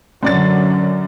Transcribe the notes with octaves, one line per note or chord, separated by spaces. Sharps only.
F#2 D3 F#3 D5 A6